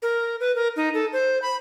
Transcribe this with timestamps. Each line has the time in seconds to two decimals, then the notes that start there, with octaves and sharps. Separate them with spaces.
0.02 A#4
0.40 B4
0.56 A#4
0.76 D#4
0.94 A4
1.13 C5
1.42 B5